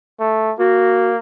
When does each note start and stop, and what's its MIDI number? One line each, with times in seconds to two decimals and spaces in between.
0.20 0.53 57
0.59 1.18 58
0.59 1.13 66